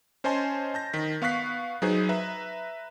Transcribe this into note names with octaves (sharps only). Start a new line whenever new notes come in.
C#4 C5 D#5 G#5 A5 C6
A5 G6 A#6
D#3 B6
B3 F5 C#6 F#6 B6 C7
F#3 D#4 G#4 B4 C5
B4 E5 A#5